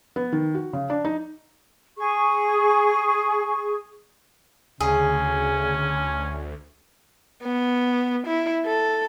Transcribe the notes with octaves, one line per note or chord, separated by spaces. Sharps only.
B3
D#3
F#4
C#3
D4
D#4
G#4 C#6
D2 C#3 C#4 G#4
B3
E4
A4